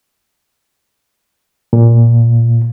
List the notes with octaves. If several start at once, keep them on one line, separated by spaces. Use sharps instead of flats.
A#2